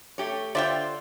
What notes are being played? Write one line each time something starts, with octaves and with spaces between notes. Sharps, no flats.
A3 G4 C#5
D3 F4 C5 D5 E5 G5